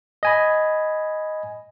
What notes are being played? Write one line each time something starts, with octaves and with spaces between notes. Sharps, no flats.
D#5 G#5 B5